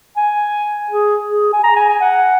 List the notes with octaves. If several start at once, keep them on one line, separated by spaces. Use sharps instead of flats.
G#5
G#4
G#4
G#5
A#5
G#5
G#5
F#5